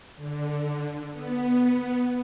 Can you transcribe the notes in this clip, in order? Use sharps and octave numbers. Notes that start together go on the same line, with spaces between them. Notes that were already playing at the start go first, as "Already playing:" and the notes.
D3
B3